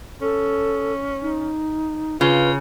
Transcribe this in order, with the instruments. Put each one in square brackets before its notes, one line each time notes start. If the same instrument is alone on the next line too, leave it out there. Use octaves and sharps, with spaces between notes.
[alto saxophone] C#4 [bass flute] A4
[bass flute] D#4
[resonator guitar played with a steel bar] C#3 [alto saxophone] F4 [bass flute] B4